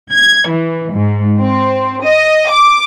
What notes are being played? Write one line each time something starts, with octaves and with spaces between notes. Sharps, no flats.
G#6
E3
G#2
C4
D#5
D6